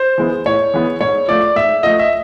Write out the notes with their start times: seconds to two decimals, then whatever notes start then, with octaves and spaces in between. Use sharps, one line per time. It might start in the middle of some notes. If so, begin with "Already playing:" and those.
Already playing: C5
0.18 E3 G#3 B3
0.46 A2 C#5
0.74 E3 G#3 B3
1.01 G#2 C#5
1.28 F3 A3 D5
1.56 G#2 E5
1.83 F3 A3 D#5
1.99 E5